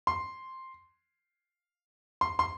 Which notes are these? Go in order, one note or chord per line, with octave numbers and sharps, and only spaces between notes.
C6
C6
C6